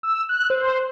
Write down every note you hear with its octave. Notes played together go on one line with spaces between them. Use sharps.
E6
F#6
C5